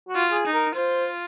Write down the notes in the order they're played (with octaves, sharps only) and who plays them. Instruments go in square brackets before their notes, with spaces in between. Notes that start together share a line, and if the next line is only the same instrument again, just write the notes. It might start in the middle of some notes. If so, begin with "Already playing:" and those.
[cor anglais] F#4
[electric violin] F4
[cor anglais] G#4
[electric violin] D#4
[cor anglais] A#4
[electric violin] F4 [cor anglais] C5